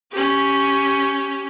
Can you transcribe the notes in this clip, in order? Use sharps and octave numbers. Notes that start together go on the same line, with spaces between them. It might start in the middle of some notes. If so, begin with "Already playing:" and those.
C#4 G4